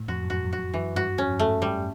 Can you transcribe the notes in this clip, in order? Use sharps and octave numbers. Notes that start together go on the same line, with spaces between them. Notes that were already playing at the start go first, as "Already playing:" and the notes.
Already playing: A2
F2 F#4
F#2
F2 F#4
F#2
F#4
F2
F#2 E3
G2 F#4
F2 C#4
F#2
A3
G#2
G3